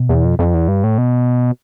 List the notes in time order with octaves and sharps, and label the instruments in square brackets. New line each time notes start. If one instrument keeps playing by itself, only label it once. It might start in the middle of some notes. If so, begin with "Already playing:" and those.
Already playing: [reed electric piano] B2
[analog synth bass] E2
F2
F2
E2
G2
A2
B2